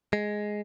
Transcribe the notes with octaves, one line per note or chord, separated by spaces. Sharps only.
G#3